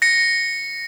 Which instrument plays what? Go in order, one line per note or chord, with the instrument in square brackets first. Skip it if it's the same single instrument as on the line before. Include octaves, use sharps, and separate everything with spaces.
[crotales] A#6 C#7